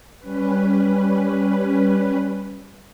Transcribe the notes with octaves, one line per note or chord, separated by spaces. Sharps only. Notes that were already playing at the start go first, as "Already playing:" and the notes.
G3 C#4 B4